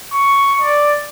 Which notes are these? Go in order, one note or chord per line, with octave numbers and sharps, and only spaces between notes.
C#6
D5